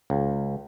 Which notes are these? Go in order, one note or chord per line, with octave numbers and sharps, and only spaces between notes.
C#2